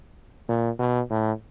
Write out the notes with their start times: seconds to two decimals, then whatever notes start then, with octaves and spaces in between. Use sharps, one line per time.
0.49 A#2
0.79 B2
1.10 A2